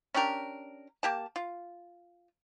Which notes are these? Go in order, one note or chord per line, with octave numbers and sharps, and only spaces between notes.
C#4 D4 G4 A#4
A#3 G4 A5
F4